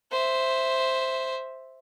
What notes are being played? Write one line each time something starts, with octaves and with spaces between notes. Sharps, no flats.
C5 E5